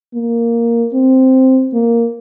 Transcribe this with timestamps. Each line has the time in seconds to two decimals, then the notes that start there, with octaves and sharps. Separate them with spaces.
0.14 A#3
0.93 C4
1.74 A#3